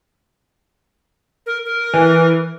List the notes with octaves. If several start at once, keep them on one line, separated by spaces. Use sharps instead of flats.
A#4
A#4
E3